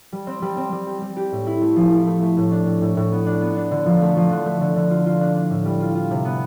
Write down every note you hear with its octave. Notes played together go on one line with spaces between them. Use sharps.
G3
C4
G3
C4
G3
G4
G3
G4
A2
E4
A3
F3
E4
A3
A3
A2
D4
A2
A2
A2
B3
D4
B3
D4
D3
F3
A3
F3
D3
A3
D3
D3
F4
F4
D4
D4
A2
G3
F4
F4
C3
B3